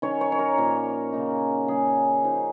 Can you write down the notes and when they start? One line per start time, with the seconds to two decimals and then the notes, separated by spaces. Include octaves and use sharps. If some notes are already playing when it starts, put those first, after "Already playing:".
0.02 D#3 C#4 C#5
0.21 C#5
0.32 C#5
0.39 A#4
0.58 A#2 F3 C#4
1.13 C#3 A#3 D#4
1.68 C#3 A#3 C#4 G#4
2.24 A#2 F3 A#3 D#4